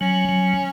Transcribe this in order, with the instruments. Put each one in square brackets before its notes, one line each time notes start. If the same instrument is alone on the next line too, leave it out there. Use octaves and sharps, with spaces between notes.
[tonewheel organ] F#3 [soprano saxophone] C#4
[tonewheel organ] F#3